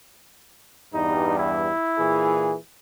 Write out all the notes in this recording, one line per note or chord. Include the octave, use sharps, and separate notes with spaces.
E2 G2 G3 D#4
E4
A#2 E3 G#4